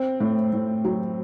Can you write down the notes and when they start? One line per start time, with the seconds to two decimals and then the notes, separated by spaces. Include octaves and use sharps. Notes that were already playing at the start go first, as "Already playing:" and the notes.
Already playing: C4
0.20 A2
0.53 A2
0.85 F#3